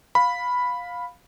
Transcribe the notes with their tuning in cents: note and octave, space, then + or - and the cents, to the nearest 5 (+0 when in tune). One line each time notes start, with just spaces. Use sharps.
F5 +15 B5 +0